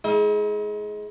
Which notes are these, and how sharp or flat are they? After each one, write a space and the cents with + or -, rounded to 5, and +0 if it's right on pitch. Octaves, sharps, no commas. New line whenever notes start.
G#3 +15 E4 -45